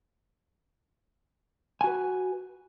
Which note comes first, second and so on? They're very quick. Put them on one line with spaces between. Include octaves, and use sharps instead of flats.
G#5 F#4 B4